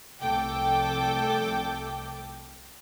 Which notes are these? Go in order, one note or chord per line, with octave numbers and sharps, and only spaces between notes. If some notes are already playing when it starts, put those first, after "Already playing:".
C2 F3 A3 A4 G5 D6